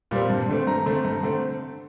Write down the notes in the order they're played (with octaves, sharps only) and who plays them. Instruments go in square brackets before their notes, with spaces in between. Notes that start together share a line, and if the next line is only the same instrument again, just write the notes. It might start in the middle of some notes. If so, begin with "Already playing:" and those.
[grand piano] A#2 G3 C4
G2
D3 A3 C4
G2 A#5
D3 A3 C4
G2
D3 A3 C4